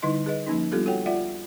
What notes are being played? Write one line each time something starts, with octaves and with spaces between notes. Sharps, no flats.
D3 G3 D#4 E4 D#5 C6
G#4 B4 D#5
F3 A#3 C#4 D#4
G3 B3 D4 F4 G4 A4
F#4 A4 C#5 F#5 G5
F4 D5 E5 F#5